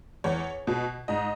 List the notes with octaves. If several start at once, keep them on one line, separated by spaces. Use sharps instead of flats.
E2 C#5
B2
G#2 D#5